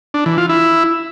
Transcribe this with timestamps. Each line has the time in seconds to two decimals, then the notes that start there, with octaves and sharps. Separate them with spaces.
0.14 D4
0.26 E3
0.38 F4
0.50 E4